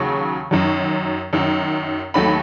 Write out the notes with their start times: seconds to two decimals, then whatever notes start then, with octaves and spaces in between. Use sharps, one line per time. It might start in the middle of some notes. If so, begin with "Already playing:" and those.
Already playing: D#2 C#3 F#3 C#6
0.51 F#2 D#3 F#3
1.33 F#2 D#3 F#3
2.14 D#2 D#3 F#3 A3 B5